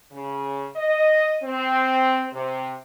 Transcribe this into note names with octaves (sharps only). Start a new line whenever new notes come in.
C#3
D#5
C4
C3